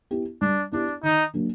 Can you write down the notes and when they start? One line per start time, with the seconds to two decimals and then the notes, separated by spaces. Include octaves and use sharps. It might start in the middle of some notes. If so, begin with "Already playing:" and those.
0.11 B3 E4 G4
0.41 G3 D4
0.72 B3 D4 E4 G4
1.03 D#3 D#4
1.34 F#3 A#3 D4